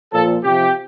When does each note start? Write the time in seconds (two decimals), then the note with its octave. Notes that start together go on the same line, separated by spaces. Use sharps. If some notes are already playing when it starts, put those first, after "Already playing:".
0.13 A#2 F3 A4
0.43 C3 F3 G4